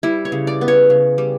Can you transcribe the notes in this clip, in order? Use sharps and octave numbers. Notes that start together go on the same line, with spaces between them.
G3 E4
C#5
C#3
D5
B3
C#5
C#3
G3